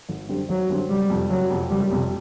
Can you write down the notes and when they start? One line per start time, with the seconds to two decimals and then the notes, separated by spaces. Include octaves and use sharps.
0.09 G#1
0.29 F#2 D3 G3 C4
0.49 G#1 F#3
0.69 F#2 D3 G3 C4
0.90 F#1 G3
1.10 F2 C3
1.30 F#1 F#3
1.50 F2 C3
1.70 F#1 G3
1.91 F2 C3